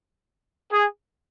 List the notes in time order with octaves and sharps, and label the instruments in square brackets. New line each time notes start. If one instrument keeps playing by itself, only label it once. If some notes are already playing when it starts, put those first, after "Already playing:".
[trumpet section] G#4